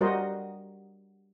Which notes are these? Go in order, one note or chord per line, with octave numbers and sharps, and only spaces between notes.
G3 F#4 A#4 C5 D#5